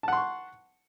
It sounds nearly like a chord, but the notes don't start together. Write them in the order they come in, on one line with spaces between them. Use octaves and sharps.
A5 F#5 C6 C#6